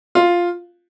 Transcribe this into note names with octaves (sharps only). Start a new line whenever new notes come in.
F4